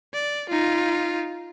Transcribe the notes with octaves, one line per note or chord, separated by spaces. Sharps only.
D5
D#4 F4